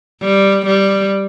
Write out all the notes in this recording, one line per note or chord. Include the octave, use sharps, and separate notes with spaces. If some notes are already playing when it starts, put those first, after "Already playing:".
G3
G3